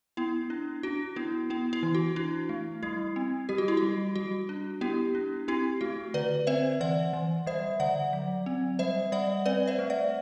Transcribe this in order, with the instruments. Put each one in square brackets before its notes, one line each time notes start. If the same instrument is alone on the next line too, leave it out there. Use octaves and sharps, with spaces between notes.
[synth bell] B3 E4
D4
D4 F#4
B3 E4
B3 E4
E4
E3
F#4
D4 E4
A3
G3 E4
C4
G3 G4
F#4
E4
F#4
G3
G3 F#4
D4
B3 E4 G4
D4
C4 E4 G4
A3 F#4
D3 B4 D5
C4 C5 E5
E3 D5 F#5
E3
G3 C5 E5
D3 D5 F#5
F#3
C4
G3 C5 E5
G3 D5 F#5
C4 B4 D5
C5 E5
A3
D5 F#5